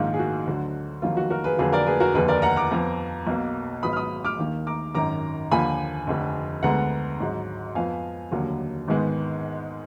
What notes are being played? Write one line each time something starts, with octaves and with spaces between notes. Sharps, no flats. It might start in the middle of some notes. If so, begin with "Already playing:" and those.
Already playing: A#1 G#2 D#3 A#3 F4
G#4
F#4
D2 D3 F#3
F1 F2 D#3 F#3 A#3 F4
F#4
F#4 A#4
G#4 B4
F2 D3 F#3 A#3 G#4 B4
A#4 D5
G#4 B4
F#4 A#4
F1 D#2 D3 G#4 B4
A#4 D5
F#5 A#5
A#5 D6
F2 F3 B3
B1 B2 A#3
G#1 G#2 F#3 B3 B5 D#6
F6
B5 D#6
D6 F6
D#2 D#3 A#3
A#5 D6
G#1 F#2 D#3 A#5 D6
D#2 D3 F3 A#3 G#5 B5
F1 F2 D3
D2 D3 G#3 B3 F#5 A#5
G#1 G#2 F#3
F2 F3 B3 F5 G#5
F1 D#2 D3 F#3 A#3
G#1 G#2 D#3 G#3 B3